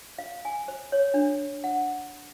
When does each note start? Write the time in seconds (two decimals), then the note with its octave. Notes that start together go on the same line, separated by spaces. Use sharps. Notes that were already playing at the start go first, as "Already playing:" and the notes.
0.18 F5
0.45 G#5
0.68 C5
0.92 C#5
1.14 D4
1.64 F#5